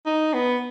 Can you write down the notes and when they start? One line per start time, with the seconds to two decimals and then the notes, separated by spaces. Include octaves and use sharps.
0.06 D#4
0.34 B3